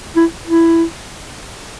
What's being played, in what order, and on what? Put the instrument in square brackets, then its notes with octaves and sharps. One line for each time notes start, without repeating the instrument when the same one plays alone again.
[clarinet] E4
E4